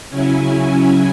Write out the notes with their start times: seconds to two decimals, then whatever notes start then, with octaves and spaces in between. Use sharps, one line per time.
0.10 C#3 F#3 C#4 E4 G#5
0.46 G#5